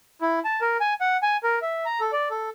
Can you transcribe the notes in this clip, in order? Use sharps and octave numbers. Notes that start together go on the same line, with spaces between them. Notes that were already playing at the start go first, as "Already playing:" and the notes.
E4
A5
A#4
G#5
F#5
G#5
A#4
E5
A#5
A4
D5
A4